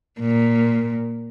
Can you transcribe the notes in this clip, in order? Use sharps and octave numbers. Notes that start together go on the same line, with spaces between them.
A#2